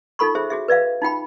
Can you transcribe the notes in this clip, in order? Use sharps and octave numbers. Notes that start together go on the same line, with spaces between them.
D#4 F4 A4 B5 C#6
G#4 C5 E5
F#4 G#4 E5
B4 D5 E5 F5
D#4 F4 G5 B5